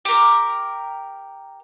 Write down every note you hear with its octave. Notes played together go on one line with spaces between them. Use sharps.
G4 A#4